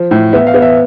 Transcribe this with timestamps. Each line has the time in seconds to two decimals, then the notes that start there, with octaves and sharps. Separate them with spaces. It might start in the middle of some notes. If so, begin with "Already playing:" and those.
Already playing: F3
0.11 A2
0.33 B3 E5
0.47 F5
0.54 B3
0.62 E5